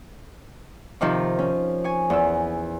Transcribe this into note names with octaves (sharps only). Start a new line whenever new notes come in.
C3 D#3 F3
C#4
G#5 C#6
E2 E6